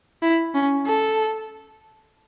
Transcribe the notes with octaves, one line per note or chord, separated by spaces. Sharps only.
E4
C#4
A4